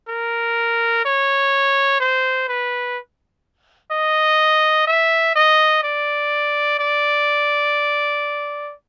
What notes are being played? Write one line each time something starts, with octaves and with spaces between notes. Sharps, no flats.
A#4
C#5
C5
B4
D#5
E5
D#5
D5
D5